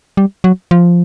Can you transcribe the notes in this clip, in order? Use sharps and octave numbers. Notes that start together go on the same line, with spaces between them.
G3
F#3
F3